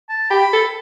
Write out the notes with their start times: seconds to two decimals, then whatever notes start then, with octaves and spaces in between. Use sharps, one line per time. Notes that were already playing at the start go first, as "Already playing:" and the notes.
0.09 A5
0.30 G4 B5
0.53 A4